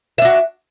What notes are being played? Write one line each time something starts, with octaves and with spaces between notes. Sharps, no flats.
D4 F#4 E5